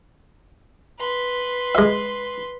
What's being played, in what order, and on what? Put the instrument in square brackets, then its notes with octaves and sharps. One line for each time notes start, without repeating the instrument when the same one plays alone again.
[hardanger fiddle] B4 C6
[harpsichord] G#3 E5